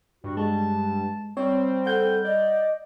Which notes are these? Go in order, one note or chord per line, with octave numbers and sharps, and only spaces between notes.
G2 F#4
G#3 A5
G3 C4 C#5
A4 F#5 G6
D5 D#5